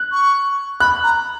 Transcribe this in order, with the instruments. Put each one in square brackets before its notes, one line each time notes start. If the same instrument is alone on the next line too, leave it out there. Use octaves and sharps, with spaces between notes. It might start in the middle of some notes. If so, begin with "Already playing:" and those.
Already playing: [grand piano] F#6
[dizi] C#6
[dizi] B5 [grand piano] F#6
[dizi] A#5